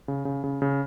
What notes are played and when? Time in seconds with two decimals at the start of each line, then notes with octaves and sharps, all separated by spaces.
0.08 C#3
0.25 C#3
0.44 C#3
0.62 C#3